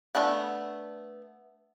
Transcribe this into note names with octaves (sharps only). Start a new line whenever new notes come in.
A3 B3 D4 F#5